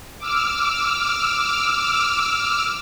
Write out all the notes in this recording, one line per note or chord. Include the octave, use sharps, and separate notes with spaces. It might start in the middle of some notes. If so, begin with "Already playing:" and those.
D6 E6 F6